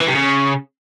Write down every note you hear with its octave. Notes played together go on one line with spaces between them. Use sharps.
E3
C3
C#3